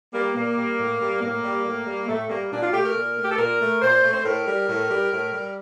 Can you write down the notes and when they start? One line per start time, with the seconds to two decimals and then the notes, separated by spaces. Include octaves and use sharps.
0.13 G3 A#3
0.35 A#2 A#3
0.57 G3
0.78 A2
1.00 G3
1.22 A2 A#3
1.44 G3
1.64 A2
1.87 G3
2.08 A2 A3
2.29 G3 A#3
2.52 A#2 D4
2.63 F4
2.73 A3 G4
2.84 A#4
2.94 A#2
3.17 A3
3.24 G4
3.31 A4
3.37 A#2 A#4
3.59 A3
3.81 A#2 C5
4.03 A3
4.13 C5
4.25 A2 A#4
4.47 G3
4.68 A2
4.90 G3
5.11 A2
5.32 G3